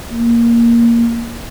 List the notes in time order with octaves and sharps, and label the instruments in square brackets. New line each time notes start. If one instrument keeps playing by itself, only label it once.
[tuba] A#3